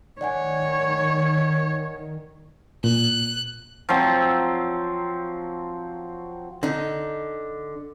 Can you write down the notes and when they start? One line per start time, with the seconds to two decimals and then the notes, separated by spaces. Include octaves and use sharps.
0.21 D#3 C#5 D5 F#5 G#5
2.84 A#2 F#6
3.89 F3 F#3 C4
6.63 D3 D#4